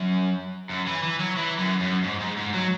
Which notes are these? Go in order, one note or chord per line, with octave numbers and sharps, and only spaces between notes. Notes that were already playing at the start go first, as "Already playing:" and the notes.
Already playing: F#2
F#2
E3
E3
F#3
E3
F#2
F#2
G#2
G#2
G#2
F#3